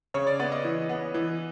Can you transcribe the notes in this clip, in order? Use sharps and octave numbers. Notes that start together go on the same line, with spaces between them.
C#3 C#5
D5
B3 D5
D#5
E3
B3
E3